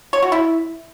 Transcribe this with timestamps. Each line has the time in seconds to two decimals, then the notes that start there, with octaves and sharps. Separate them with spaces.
0.13 C#5
0.22 F#4
0.32 E4